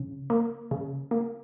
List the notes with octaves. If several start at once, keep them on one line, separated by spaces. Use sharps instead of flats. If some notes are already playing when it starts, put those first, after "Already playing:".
Already playing: C#3
A#3
C#3
A#3